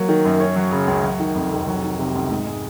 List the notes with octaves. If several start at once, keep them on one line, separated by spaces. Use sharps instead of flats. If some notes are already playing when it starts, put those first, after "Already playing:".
Already playing: F#3 A#3
D#3
F#2
C#4
F#3
C#3
C#2
F#3
D#3
F2
F1
F#3
D#3
C3
C#2
G#2
G#3